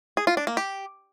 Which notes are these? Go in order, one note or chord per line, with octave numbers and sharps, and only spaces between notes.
G#4
F4
D4
A#3
G4